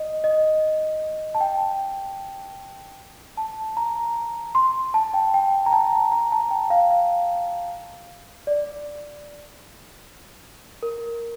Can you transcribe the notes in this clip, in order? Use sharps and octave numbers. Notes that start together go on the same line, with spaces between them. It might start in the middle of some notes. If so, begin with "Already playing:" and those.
Already playing: D#5
D#5
A5
G5
A5
A#5
C6
A5
G5
G5
A#5
A5
A#5
A5
G5
F5
F5
D5
A#4